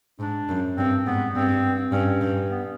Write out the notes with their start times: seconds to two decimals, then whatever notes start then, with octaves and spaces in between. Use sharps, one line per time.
0.20 G#2 D4
0.49 F#2
0.77 G2 C4
1.06 G#2 B3
1.35 G2 C4
1.92 G2 C#4
2.21 G2
2.50 B3